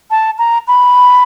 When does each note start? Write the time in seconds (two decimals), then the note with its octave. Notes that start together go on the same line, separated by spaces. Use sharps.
0.11 A5
0.38 A#5
0.67 B5